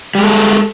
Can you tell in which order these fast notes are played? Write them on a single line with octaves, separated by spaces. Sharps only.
G3 G#3 A4